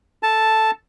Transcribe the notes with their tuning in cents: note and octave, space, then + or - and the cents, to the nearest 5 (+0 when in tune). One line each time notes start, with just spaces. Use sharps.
A4 +0 A5 +0